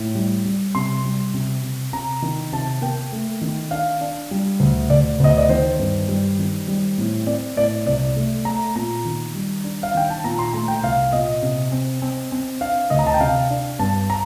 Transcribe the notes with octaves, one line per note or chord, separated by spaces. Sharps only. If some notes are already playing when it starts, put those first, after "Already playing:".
Already playing: A2
G3
G3
C3 C6
G3
C3
C3
C3 A#5
D#3
C3 A5
A#3 G5
A3
D#3
D4 F5
D4
G3
D2
D2 D5
D2 D#5
D5
D#3 C5
G2
G3
D#3
G3
A2
C4 D5
A2 D5
C2 D5
A3
A3 A#5
A#2 A#5
D#3
G3
D4
F5
D#3 G5
A5
A#2 A#5
C6
A3 A#5
G5
C2 F5
A#2 D#5
C3
C4
C4
C4
D4 F5
D2 D#5
A#5
A5
G5
C3 F5
D4
G2 A5
A#5